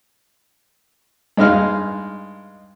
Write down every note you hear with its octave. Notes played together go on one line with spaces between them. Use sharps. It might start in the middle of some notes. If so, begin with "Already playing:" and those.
G2 G#3 D#4 F5 F6